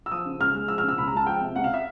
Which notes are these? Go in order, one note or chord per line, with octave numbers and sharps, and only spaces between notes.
E6
F3 D#6
C#3
C#2 F6
G#3
F3 E6
F6
C#3
E6
C#2 B5
A#5
G#3 A5
F3 G5
C3
C#2 F#5
F5
E5